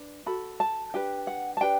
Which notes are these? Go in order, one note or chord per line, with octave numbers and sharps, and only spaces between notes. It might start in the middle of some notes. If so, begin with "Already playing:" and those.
Already playing: D4 B4
F#4 A4 B5
A5
D4 G4 B4 G5
F#5
A5
D4 G4 B4 G5